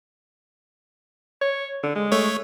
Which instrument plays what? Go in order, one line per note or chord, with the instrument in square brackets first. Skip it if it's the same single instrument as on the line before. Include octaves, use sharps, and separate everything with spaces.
[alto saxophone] C#5
D3
G#3
[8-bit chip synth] A3 C#5